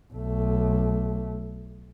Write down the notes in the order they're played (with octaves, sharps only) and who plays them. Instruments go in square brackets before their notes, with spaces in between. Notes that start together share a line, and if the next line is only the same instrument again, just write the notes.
[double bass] B1 A3